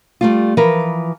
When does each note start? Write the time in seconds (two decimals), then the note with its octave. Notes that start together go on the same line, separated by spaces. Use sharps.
0.21 G3 A3 F4
0.57 E3 F3 A#4 B4